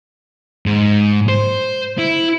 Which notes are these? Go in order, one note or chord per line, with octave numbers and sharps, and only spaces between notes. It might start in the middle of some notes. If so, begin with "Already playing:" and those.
G#2
C5
E4